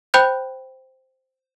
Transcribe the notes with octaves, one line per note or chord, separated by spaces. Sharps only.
C5 G5 B5 F#6 G6